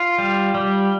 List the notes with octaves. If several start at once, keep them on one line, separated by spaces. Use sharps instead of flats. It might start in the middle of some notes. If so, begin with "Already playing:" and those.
Already playing: F4
G3
G3